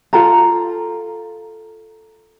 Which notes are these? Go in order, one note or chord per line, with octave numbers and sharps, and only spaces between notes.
F4 A4 G5 A#5